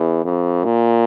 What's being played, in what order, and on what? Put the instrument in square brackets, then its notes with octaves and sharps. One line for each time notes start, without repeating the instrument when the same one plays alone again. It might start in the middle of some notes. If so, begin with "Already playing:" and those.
Already playing: [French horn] E2
F2
A#2